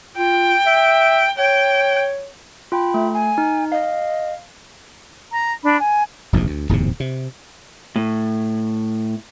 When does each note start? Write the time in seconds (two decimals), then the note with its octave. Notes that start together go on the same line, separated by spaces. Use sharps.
0.17 F4 G5
0.67 E5
1.38 C#5 G5
2.72 F4 G5 B5
2.94 A3 E5
3.13 G#5
3.38 D#4
3.72 D#5 F5
5.31 A#5
5.64 D4 B5
5.80 G#5
6.33 F1 A#1 E2 G#2
6.47 D2
6.69 D1 E2 G#2 C3
7.00 C3
7.96 A2